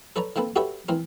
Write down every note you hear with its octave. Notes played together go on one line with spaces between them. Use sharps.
A4 B4 C#5 D5 A#5
D#3 A#3 C4 A4 B4
F#4 G4 A4 B4 C#5 E5
E3 C4 A#4